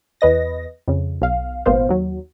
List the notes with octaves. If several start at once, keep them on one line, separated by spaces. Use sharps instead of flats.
E2 B4 D#5 A#6
F2 C#3
B1 F5
G#1 A#2 B3 C5 F5
D#2 F#3